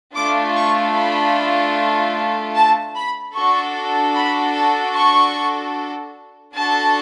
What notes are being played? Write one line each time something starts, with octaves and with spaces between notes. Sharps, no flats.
A3 D4 F4 A4 D6
C#6
B5
A5
B5
D4 F#4 A4 C#6
B5
A5
C#6
D4 F#4 A4 A5